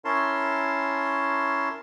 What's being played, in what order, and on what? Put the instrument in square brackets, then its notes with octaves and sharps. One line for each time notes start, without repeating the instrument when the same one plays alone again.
[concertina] C#4 E4 A#4 C#5 A5 C6